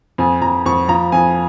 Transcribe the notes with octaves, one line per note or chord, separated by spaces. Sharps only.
F2 G#5
F2 A#5
F2 C#6
F3 A#5
F2 G#5